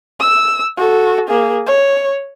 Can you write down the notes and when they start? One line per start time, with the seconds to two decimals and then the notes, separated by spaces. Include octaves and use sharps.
0.20 E6
0.77 F#4 A4
1.29 A#3 G#4
1.67 C#5